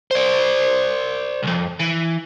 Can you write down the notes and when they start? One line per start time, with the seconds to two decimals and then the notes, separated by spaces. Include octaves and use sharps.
0.11 C5 D5
1.43 C2 F2
1.79 E3